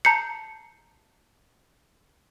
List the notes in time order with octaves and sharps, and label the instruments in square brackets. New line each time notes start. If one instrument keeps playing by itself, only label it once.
[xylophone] A5 A#5 G6 C7 C#7